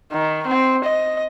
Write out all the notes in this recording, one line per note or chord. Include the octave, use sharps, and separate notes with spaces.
D#3
C4
D#5